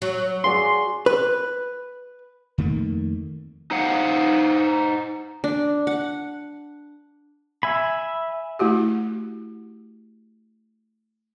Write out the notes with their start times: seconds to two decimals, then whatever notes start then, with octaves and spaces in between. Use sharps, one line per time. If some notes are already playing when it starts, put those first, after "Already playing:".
0.02 F#3
0.44 F#4 G#4 D5 C6
1.06 B4
2.58 F2 D#3 A3 A#3
3.71 D#4 C5 F5 F#5
5.44 D4
5.87 F#5
7.63 E5 G#5 B5
8.59 A3 E4 F#4 G4